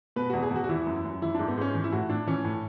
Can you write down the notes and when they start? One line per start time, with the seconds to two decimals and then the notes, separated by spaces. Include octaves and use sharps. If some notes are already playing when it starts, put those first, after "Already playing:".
0.16 B2 B4
0.30 E2 F#4
0.43 G#4
0.51 E2 F#4
0.64 F#4
0.69 E3 E4
0.86 F#2
1.04 F#2
1.22 E3 E4
1.35 G#2 D4
1.48 B3
1.57 G#2 C#4
1.75 E3
1.84 E4
1.92 A2 F#4
2.10 A2 D4
2.27 E3 C#4
2.45 A2